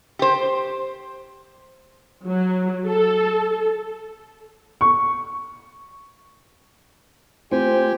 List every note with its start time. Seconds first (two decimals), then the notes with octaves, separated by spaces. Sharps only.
0.19 G4 C5
2.26 F#3
2.87 A4
4.81 C#6
7.51 A3 C4 F4 G4 C5 G5 G#5